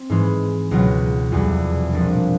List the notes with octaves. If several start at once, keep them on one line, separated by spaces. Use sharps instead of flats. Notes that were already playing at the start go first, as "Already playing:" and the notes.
Already playing: C4
G#2 E3 G#3
C#2 B2 F#3
F1 E2 B2 G3
A#1 A#2 F3 A#3 D4